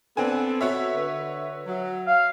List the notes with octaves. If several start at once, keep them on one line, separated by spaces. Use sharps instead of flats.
B3 C4 D4 A4 G#5
F#4 C#5 E5
D3 B4
F#3
F5